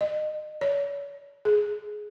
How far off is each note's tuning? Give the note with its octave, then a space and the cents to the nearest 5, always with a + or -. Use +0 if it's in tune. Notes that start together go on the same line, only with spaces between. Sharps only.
D#5 -30
C#5 +40
G#4 +15